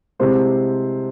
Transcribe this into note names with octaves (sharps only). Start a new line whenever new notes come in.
C2 C3 G#3 C5